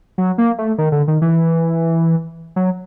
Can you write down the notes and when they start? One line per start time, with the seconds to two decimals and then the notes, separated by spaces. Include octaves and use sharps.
0.18 F#3
0.38 A#3
0.58 A3
0.78 D#3
0.92 D3
1.08 D#3
1.22 E3
2.56 F#3